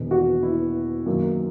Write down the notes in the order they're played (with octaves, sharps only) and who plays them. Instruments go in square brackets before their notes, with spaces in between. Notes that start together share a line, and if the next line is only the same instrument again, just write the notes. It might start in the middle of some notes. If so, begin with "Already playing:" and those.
Already playing: [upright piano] E1 E2 D#3 G#3
F#4
E4
F#2 D#3 A#3